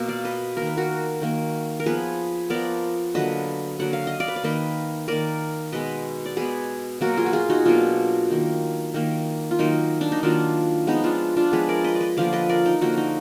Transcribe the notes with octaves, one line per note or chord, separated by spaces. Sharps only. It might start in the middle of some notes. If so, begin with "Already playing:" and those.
Already playing: B2 A#3
D5 F5
B4 D#5
D#3 A#3 A#4
B4
F#4 A#4
D#3 A#3
A#4
F3 B3 G#4 B4
F3 B3 A#4 D5
D3 F#3 A#3 B4 D#5
D3 F#3 A#3 F#5
F5
D#5
D5 F5
B4
D5
D#3 A#3 B4 D#5
D#3 A#3 A#4 D5
B2 G#3 B3 B4 D#5
D5
B2 G#3 B3 G#4 B4
B2 F#3 A#3 F#4 A#4
F4 G#4
F#4
F4 G#4
D#4 F#4
B2 F#3 A#3 D4 F4
D#3 A#3
D#3 A#3
F4
D#3 F#3 A#3 D#4
D4
D#4
D#3 F#3 A#3 D4 F4
F3 G#3 B3 D#4
D4 F4
D4 F4
F3 G#3 B3 G#4 B4
A#4 D5
B4 D#5
D5
B4 D#5
D3 F3 A#3 D5 F5
B4 D#5
A#4 D5
D#4
D3 F3 A#3 D#4 F#4
D#4